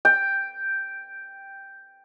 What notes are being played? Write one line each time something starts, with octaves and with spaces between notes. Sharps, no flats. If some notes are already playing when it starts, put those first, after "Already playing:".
G5